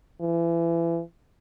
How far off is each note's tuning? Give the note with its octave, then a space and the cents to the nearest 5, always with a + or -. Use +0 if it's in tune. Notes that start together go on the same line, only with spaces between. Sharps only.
E3 +30